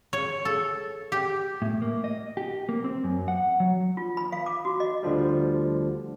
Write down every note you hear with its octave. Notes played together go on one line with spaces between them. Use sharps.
C#5
A4
G4
A2
A#3
D#5
G4
A#3
C4
F#2
F#5
F#3
F4
B5
F5
D6
F#4
D#5
D2 D3 F3 G3